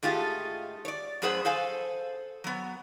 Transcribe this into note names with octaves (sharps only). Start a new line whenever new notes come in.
G#2 A3 F4 G4 G#4
C#5 D5
F#2 A2 G#4 B4 C5 F#5
A4 C5 F5 G#5
F#3 B3